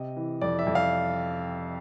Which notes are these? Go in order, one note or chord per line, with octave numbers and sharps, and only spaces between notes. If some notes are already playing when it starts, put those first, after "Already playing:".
Already playing: C3 D#5
E3
F2 D5
E5
F2
F5